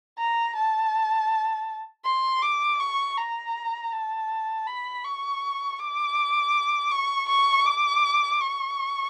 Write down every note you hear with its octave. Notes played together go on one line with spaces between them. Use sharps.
A#5
A5
C6
D6
C#6
A#5
A5
B5
C#6
D6
C#6
C#6
D6
C#6